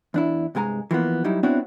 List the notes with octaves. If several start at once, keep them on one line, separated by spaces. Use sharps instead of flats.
E2 D4 E4
C2 G2 G#3 G#5 A#5
E3 F3 A#3 B3
F#3 G3 D#4 E4
B3 C4 D4 E4 F#4 C#5